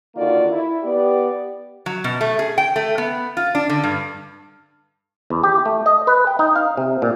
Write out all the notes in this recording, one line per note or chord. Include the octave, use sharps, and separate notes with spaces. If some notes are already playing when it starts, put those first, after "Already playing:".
D3 D#3 A#3 F4 F#4 D5
E4
B3 G4 D5
F#3
B2
A3
G#4
G5
A3
B3
F4
D4
D3
G2
E2
G4
A3
D#5
B4
G5
D#4
F5
C3
A#2